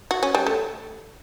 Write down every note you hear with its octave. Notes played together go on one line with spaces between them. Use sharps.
F#4
C#4
G3
A3